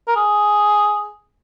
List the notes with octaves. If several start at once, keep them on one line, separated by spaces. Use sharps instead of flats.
A#4
G#4